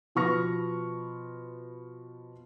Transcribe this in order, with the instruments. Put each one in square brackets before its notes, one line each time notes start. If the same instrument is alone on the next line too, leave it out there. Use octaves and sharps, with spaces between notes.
[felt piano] B2 F3 B4 C#6 F6 A#6